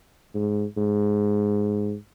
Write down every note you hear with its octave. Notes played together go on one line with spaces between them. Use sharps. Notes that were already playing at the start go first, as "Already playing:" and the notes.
G#2
G#2